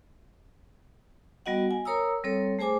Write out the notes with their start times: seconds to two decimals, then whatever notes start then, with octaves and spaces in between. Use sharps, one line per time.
1.46 G3 B3 F#4 D#5 F#5
1.71 G#5
1.85 A#4 C#5 A#5 D#6 E6
2.24 G3 C4 A4 C#5
2.59 A3 G#4 C5 G#5 D6